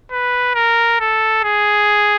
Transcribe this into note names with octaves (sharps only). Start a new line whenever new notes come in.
B4
A#4
A4
G#4